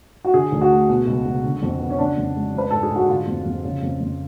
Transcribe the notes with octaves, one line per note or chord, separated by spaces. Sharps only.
F#4
D3 G#4
D2
F#4
A3
B2
C#2
C#2
D3
F2
B3
C#4
C#3 D4
F2
G#3
F3 B4
G#2 A4
G#4
G#2 F#4
D3 F4
F2
F2
C#3
F2
F2